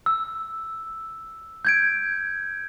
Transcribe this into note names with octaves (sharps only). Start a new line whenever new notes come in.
E6
G6 G#6 D7